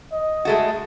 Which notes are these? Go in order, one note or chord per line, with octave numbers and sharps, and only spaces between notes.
D#5
G#3 A3 F#4